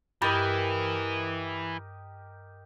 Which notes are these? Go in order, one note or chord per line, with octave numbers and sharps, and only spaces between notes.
G2 E3 G4 A#4 D#5 B5 A6